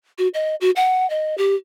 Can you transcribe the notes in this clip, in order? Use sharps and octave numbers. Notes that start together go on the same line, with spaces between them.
F#4
D#5
F#4
F#5
D#5
G4